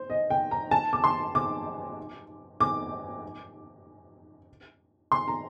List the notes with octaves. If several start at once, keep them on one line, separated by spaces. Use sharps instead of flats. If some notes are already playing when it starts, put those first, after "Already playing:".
Already playing: C5
D#5
G5
A#5
A5
D6
C6
D6
D6
C6
A#5